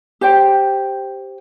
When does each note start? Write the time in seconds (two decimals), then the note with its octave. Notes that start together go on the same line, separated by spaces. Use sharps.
0.21 G4 C5 G5